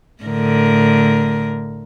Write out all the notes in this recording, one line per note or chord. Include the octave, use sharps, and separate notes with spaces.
A2 D3 A#4